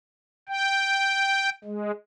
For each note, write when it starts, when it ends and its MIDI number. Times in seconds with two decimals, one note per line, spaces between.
0.49 1.49 79
1.64 1.91 56